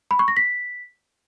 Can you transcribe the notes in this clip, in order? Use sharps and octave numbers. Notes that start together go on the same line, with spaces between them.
B5
C#6
A#6
B6